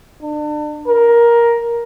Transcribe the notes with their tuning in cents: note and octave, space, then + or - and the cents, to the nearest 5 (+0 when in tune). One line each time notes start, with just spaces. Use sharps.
D4 +35
A#4 +10